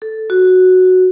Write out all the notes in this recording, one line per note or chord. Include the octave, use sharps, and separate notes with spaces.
A4
F#4